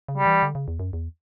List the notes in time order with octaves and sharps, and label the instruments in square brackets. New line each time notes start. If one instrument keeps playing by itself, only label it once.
[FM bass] C#3
[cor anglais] G3
[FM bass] E3
D3
C#3
E2
F#2
E2